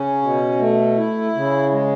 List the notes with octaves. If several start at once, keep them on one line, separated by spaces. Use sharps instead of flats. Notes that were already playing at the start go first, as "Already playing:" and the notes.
Already playing: C#3 C#4
B2
A3
E4
C#3
G#3